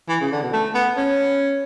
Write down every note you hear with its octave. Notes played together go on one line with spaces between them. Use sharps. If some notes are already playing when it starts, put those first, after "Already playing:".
E3
C#3
D3
B2
A3
B3
C#4